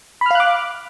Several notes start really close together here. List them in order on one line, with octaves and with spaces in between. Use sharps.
B5 F6 F5 F#6 D6